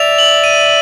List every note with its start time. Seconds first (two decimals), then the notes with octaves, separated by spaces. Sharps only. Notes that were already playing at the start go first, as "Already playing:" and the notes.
Already playing: D5 E5 F7
0.18 F#7
0.44 D#7